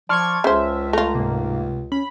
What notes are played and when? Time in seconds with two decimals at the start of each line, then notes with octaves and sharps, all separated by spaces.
0.09 F3 D5 A5 C6 C#6 F6 G#6
0.44 C#2 C#3 C5 E5
0.93 A3 F4 A#5
1.15 G#2 C3 A#3
1.92 C#4 B5